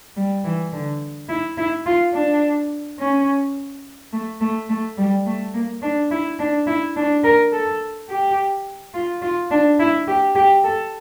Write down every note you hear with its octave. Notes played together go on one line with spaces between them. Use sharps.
G3
E3
D3
E4
E4
F4
D4
C#4
A3
A3
A3
G3
A3
A#3
D4
E4
D4
E4
D4
A#4
A4
G4
F4
F4
D4
E4
G4
G4
A4